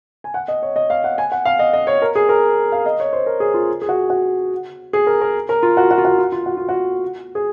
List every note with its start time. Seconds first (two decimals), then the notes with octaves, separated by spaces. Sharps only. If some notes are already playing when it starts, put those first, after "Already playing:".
0.24 G#5
0.34 F#5
0.48 D#5
0.62 C#5
0.76 D#5
0.90 F5
1.04 F#5
1.18 G#5
1.32 F#5
1.45 F5
1.59 D#5
1.73 D#5
1.87 C#5
2.02 A#4
2.15 G#4
2.29 A#4
2.72 F5
2.86 D#5
3.00 C#5
3.13 C5
3.26 A#4
3.40 G#4
3.54 F4
3.82 G#4
3.89 F#4
4.10 F#4
4.93 G#4
5.07 A#4
5.21 A#4
5.49 A#4
5.63 F4
5.77 F#4
5.91 F#4
5.98 F4
6.05 F#4
6.19 F4
6.32 F4
6.46 F#4
6.57 F4
6.69 F#4
7.35 G#4